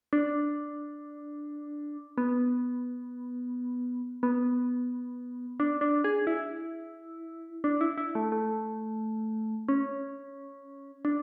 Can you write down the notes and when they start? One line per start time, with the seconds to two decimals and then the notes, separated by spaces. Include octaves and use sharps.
0.13 D4
2.18 B3
4.23 B3
5.60 D4
5.81 D4
6.04 G#4
6.27 E4
7.64 D4
7.81 E4
7.98 E4
8.15 A3
8.32 A3
9.68 C#4
11.05 D4